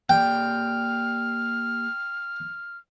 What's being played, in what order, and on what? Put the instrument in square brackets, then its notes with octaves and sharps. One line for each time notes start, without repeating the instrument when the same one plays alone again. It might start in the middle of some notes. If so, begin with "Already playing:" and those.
[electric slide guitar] A#3 G4 D5 [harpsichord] G5 [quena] F6